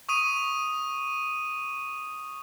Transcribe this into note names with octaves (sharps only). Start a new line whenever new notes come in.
C#6 D#6 D#7